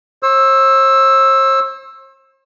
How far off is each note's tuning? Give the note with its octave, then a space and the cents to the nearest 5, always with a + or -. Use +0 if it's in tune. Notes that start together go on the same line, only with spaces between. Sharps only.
C5 +45 E6 +0